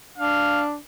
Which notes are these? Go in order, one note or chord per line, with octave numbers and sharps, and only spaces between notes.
D4 F5